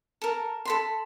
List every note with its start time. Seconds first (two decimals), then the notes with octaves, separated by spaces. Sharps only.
0.22 A4 A#4
0.65 A4 B5 C6